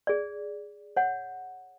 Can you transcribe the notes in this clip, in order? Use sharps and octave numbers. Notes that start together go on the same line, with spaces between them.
G#4 D5
C#5 F#5